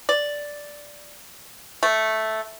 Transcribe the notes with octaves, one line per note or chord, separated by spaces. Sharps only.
D5
A3